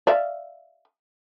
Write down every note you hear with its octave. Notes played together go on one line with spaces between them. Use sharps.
D5 E5 F5